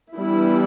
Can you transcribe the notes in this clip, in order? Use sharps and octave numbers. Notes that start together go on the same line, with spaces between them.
E3 G3 B3 D4 E4